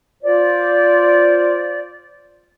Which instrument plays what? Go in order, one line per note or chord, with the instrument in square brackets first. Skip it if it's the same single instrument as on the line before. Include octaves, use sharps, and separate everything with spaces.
[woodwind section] F4 C5 D5